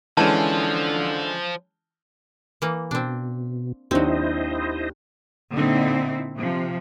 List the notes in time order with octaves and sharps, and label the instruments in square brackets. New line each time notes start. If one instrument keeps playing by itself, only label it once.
[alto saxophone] D3 [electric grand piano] E3 G#3 C#4 [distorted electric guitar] F3 [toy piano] A5
[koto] E3 A#3
[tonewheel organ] B2 [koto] C4 D4
[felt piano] D#2 D4 [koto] F#3 C4 [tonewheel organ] E4 C5 D#5
[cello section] A#2 D3 C4 D#4 E4
C3 F3